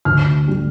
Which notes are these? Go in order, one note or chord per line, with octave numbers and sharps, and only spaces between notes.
D2 F6
D3 G3